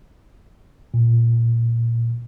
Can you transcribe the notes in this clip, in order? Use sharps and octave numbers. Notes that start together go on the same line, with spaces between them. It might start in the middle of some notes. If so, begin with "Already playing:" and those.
A#2